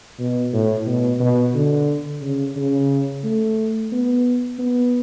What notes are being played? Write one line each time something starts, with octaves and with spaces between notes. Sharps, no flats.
B2
A2
B2
B2
D3
C#3
C#3
A3
B3
B3